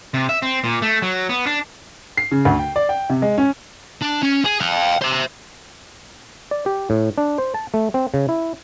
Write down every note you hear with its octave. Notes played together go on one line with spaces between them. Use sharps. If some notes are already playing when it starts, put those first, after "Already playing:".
C3
E5
C4
A#2
A3
F#3
B3
D4
C7
C#3
D2
G5
D5
G5
C3
G#3
C#4
D4
C#4
G#4
F5 G5
C5 E5
D5
G4
A2
D4
C5
A5
A3
C4
C#3
E4